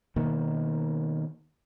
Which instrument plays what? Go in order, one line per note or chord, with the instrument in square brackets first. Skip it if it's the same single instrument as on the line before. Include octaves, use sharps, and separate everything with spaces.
[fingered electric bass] B2 D#3 A#3